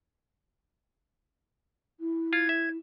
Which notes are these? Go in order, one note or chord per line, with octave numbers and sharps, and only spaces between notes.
E4
F4 G#6
E5